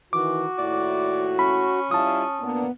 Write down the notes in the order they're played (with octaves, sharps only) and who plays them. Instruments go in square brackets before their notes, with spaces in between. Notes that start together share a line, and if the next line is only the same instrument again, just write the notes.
[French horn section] D#3 E3 [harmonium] F#4 [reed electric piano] D6
[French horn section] D#2 A2 E4 [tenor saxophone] D5
[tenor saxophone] C#4 [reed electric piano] B5
[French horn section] G3 E4 F4 [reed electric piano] A5 D#6
[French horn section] A#2 A#3 D4 [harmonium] B3